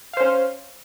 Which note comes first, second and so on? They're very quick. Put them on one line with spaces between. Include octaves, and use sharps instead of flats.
F5 C5 C#4